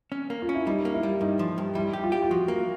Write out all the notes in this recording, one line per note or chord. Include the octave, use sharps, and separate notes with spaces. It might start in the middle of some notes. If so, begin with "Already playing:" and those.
C#4
A#3
F4
C#4
E4
G3 D#4
A#3
E4
G3
G2 D#4
F3
G2
G3 E4
G4
F4
G4
F4
F3 F#4
A#3